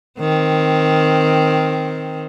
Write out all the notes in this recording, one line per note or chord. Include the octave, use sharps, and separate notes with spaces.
D#3 C4